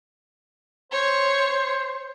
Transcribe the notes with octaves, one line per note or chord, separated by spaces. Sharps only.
C5 C#5